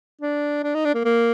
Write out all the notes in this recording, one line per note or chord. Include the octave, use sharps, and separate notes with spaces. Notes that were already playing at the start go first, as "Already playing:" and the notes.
D4
D4
D#4
D4
A#3
A#3